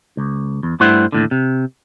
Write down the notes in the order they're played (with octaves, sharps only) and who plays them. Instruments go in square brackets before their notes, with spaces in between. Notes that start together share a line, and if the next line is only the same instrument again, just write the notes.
[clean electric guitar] C#2
E2
G2 G3 A3 E4 C5 F#5
D#2 A2 D3
C3